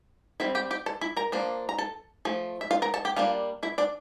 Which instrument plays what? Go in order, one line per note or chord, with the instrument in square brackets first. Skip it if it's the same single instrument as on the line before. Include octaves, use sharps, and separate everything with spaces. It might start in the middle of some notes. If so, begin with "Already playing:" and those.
[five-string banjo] G3 C4 E4 E5
G4 G5
G4 G5
A4 A5
E4 E5
A#4 A#5
F3 A#3 D4
A#5
A4 A5
F3 A3
E5
F4 F5
A#4 A#5
A4 A5
G4 G5
G3 A#3 D4 F4 F5
E4 E5
D4 D5